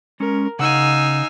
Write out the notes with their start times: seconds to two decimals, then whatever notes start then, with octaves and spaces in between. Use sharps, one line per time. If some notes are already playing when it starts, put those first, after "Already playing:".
0.20 G#3 C#4 A#4
0.59 C#3 D#4 F5 F#5 G#5 E6